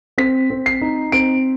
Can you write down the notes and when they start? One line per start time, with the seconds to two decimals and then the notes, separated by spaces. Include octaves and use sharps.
0.18 C4 B6
0.50 C4
0.66 C7
0.81 D#4
1.12 C4 D7